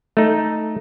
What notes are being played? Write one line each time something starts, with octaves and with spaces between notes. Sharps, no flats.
A3 D#4